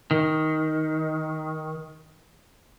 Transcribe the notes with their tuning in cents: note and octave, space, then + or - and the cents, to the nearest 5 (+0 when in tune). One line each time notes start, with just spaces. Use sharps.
D#3 +10